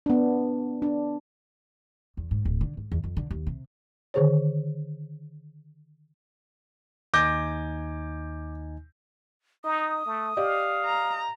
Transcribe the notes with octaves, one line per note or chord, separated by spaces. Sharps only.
B3 D4
D4
E2
G#2
D1
D3
G#2
E2
F2
D3
D#2
C3
D3 D#3 G#4 C5 C#5
D#2 D#4 G#5 D6 G6 A#6
D#4 D#6
A3
G4 D5 D#5 F5
A#5